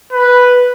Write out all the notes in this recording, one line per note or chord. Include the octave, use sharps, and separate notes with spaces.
B4